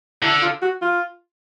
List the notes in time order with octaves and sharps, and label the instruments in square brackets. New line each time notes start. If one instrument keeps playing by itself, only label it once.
[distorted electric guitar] D3 [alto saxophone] E4
[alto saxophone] F4
F#4
F4